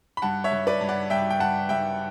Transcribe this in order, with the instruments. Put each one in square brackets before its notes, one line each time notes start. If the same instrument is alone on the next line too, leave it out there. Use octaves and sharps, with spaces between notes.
[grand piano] B5
G2 F#5 A5
C#5 E5
G2
B4 D5
G2
D5 F#5
G2 E5 G5
G5
G2 F#5 A5
G2 E5 G5